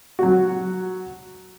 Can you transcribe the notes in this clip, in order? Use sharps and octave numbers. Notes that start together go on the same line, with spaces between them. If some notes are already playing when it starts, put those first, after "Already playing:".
F#3 F#4